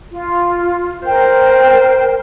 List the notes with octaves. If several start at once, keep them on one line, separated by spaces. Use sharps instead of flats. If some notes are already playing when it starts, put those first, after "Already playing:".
F4
A#4 C5 G5